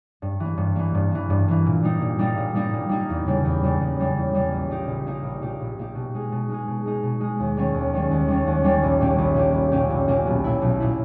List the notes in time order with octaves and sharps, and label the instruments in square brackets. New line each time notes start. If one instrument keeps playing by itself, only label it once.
[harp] G2
E3 A#3
G2
E3 A#3
G2
E3 A#3
G2
E3 A#3
A#2
G3 A#3 D#4
A#2
G3 A#3 D#4
A#2
G3 A#3 D#4
A#2
G3 A#3 D#4
E2
C#3 G3 A#3
E2
C#3 G3 A#3
E2
C#3 G3 A#3
E2
C#3 G3 A#3
A#1
A#2 A#3 D#4 G4
A#1
A#2 A#3 D#4 G4
A#1
A#2 A#3 D#4 G4
A#1
A#2 A#3 D#4 G4
B2
G#3 D#4 G#4
B2
G#3 D#4 G#4
B2
G#3 D#4 G#4
B2
G#3 D#4 G#4
D#2
D#3 G3 A#3 C#4
D#2
D#3 G3 A#3 C#4
D#2
D#3 G3 A#3 C#4
D#2
D#3 G3 A#3 C#4
A#1
A#2 A#3 C#4 G4
A#1
A#2 A#3 C#4 G4
A#1
A#2 A#3 C#4 G4
A#1
A#2 A#3 C#4 G4
B1
A#2 A#3 E4
B1
A#2 A#3 E4